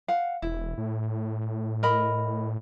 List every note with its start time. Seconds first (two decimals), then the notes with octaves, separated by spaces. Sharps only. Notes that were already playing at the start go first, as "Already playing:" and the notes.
0.08 F5 F#5
0.42 E1 E4
0.78 A2
1.83 A#4 D#5 B5